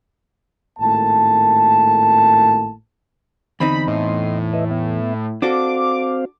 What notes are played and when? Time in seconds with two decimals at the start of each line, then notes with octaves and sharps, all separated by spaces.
0.79 G#1 A2 A#3 A5
3.60 E2 D3 C4 D#4 B5
3.88 A2 D#5 C6
4.53 B4 D#5 E5
4.71 B3 E5
5.42 C4 D4 F#4 A4 C5 F5 D6